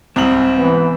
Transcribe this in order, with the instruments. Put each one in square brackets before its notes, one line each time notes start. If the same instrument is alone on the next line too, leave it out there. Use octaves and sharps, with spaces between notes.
[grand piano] C2 G#2 F#7 [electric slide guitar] C4
[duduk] E3 [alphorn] B3